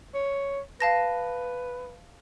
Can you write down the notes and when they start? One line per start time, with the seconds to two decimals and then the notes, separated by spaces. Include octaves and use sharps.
0.14 C#5
0.80 B4 F5 A5 A#6